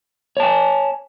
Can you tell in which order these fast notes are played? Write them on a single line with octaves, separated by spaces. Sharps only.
C#5 A5 G#5